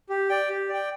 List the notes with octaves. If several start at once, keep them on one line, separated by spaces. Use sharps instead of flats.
G4
D5 G5
G4
D5 G5